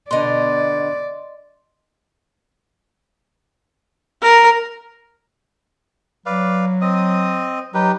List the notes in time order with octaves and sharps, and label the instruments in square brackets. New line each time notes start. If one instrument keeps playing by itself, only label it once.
[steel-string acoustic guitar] B2 D3 [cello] D5 [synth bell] D#5 C6
[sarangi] A#4
[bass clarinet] F#3 [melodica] B4 D5 F5
[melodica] C4 D#5 D#6
[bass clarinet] F#3 [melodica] D#4 G4 B4